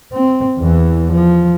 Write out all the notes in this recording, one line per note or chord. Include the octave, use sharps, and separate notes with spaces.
C4
E2 E3
F3